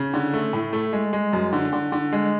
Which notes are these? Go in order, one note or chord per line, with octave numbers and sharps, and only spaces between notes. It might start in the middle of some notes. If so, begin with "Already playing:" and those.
Already playing: C#3
D3
A3
A2
A3
G#3
G#3
F#2
D3
D3
D3
G#3